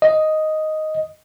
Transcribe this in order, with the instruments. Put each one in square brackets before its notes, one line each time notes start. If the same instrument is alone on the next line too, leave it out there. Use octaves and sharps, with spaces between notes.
[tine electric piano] D#5